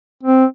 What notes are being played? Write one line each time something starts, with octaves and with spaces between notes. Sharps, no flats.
C4